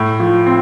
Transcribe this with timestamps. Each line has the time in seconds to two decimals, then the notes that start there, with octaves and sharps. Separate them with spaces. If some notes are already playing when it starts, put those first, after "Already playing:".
Already playing: A2
0.20 F3
0.46 C4